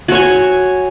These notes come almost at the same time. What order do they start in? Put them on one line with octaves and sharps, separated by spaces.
F#4 C#5 G#5